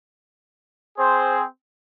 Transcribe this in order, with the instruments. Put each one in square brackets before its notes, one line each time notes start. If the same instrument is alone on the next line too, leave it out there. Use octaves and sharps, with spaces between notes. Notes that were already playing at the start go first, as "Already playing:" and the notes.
[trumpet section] C4 G#4 C5